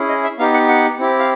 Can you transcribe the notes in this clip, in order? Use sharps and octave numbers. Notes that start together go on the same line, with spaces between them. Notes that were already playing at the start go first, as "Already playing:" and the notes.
Already playing: C#4 E4 G#4
D#5
E5
B3 D#4 G4 F5
F#5
F#5
C4 E4 G4
F5